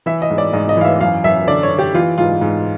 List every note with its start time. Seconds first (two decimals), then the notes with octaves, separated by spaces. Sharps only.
0.06 E3 E5
0.22 D#5
0.30 G#2
0.38 D5
0.53 G#2 D#5
0.69 D#5
0.77 E3 F5
0.85 E5
1.01 F#2 F5
1.24 F#2 E5
1.47 D3 D5
1.63 C#5
1.71 D3
1.79 G4
1.94 E3 F4
2.18 G#2 F4
2.41 G#2